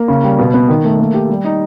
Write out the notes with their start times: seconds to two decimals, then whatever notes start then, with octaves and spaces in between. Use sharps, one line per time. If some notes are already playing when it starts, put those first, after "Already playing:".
Already playing: A#3
0.08 C#3
0.23 G3
0.39 B2
0.54 B3
0.68 D#3
0.84 A3
0.99 A#3
1.14 G4
1.29 G3
1.44 D#4